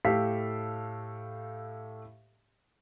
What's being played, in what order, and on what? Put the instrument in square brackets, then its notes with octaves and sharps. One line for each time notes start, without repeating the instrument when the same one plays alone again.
[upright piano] A2 G4 A4 F5 B6